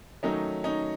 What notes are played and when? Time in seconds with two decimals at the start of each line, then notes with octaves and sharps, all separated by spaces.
0.23 D#3 F#3 A3 C#4 D#4
0.64 C#4 D#4